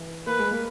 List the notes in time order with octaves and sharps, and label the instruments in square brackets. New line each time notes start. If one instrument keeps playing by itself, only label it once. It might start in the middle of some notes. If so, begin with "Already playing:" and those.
Already playing: [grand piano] E3
[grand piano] A#3 [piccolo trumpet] B4
[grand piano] G#3
A#3